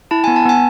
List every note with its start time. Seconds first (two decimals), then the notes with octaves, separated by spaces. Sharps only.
0.11 E4 A5
0.24 B3 G#5
0.36 A5
0.45 B3 G#5